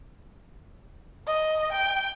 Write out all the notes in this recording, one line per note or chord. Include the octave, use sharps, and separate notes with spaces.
D#5
G5